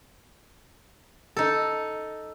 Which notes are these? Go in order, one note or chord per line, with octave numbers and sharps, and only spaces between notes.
D#4 A4